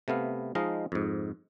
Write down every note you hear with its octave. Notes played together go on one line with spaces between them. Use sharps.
C3 A3 B3 F5
F3 G#3 D#4 D#5 F5
F2 G#2